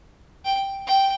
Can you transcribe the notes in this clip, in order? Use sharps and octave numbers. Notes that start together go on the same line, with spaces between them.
G5
G5